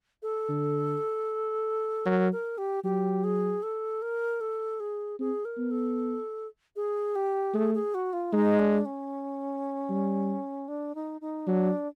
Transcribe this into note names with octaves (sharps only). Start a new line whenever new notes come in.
A4
D3
F#3 A#4
A#4
G4
F#3 G4
G#4
A4
A#4
A4
G#4
C4 G#4
A#4
B3
A4
G#4
G4
A3 G#4
G#4
F#4
F4
G#3 D#4
D4
C#4
G3
D4
D#4
D#4
F#3 D4